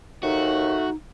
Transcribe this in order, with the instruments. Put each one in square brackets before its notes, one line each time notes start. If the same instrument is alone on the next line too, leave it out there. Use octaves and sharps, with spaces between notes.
[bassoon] D#2 [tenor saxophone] A3 [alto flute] D#4 [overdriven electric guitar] F#4